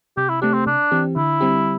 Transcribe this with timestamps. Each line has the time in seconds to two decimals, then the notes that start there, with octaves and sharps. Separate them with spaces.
0.17 C3 G4
0.29 E4
0.42 A3 C4 D4 G4
0.54 C4
0.66 C3 D4
0.92 E3 C4 G4
1.16 D3 E4
1.41 G3 C4 G4